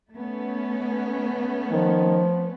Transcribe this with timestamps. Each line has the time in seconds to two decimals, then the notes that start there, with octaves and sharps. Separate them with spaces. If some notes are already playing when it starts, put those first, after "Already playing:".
0.12 A3 B3 C#4
1.71 D#3 F3